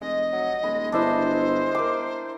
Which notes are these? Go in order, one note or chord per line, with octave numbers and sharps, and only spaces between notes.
F1 G#3 D#5
F#3
D#1 G#3 B5
G1 D4 E4 C5 E5
A#4 D6